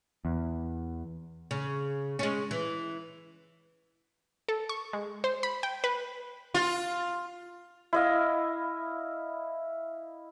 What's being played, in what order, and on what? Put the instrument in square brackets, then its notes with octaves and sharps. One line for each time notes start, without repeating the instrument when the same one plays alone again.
[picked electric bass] E2
[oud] C#3
G#3 C#4
E3
[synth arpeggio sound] A4
C#6
G#3
C5
B5
G5
B4
[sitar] F4
[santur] E4 D#5 F5